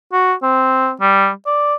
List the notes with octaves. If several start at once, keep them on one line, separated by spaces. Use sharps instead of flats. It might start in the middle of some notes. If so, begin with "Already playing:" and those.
F#4
C4
G3
D5